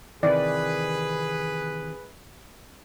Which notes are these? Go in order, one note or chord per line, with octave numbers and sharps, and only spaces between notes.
C3 D#3 E3 G#4 B4 D5